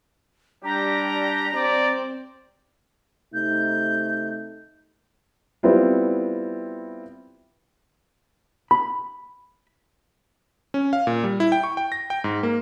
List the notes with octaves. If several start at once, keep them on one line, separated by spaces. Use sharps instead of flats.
G3 D4 G4 A#5
C4 D5
C3 A3 D#4 G6
G3 B3 C4 E4 F4
B5
C#4
F5
A#2
G3
E4
G5
C#6
G5
A#6
G5
G#2
A#3